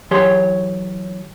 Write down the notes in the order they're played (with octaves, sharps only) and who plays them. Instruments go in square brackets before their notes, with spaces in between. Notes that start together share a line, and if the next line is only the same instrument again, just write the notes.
[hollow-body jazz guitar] E3 F#3 G4 C#5 C6